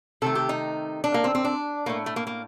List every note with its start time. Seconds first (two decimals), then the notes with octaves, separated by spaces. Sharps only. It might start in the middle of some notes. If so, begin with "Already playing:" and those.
0.22 C3 D#3 A3 A4
0.35 G4
0.49 D#4
1.04 D4
1.14 A#3
1.24 C4
1.35 C4
1.45 D4
1.86 A2 A3 A#3
2.06 A3
2.16 A#3
2.27 A#3